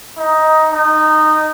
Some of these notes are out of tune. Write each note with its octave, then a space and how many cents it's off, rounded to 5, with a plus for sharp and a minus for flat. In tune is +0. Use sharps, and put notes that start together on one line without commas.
D#4 +10
D#4 -15